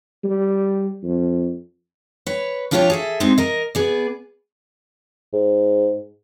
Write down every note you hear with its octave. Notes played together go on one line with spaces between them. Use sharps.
G3
F2
B4 C#5
F3 D4 F4 G4 C5 C#5
G#4 A4 E5
G#3 C4 D4 D#4 G4
A#4 D#5
B3 G#4 D5
G#2